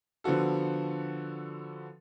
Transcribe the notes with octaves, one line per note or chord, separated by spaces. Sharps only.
D3 F3 B3 F#4 A4